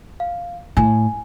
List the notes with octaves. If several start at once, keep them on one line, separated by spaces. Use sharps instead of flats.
F5
A2 G#5